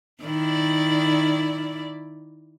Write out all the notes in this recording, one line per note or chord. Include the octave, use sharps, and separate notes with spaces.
D#3 E4 D5